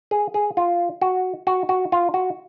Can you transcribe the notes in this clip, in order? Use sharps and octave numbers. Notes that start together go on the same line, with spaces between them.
G#4
G#4
F4
F#4
F#4
F#4
F4
F#4